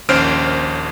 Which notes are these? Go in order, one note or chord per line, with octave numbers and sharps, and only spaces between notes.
A#1 D#2 C#4 C5 F6 D7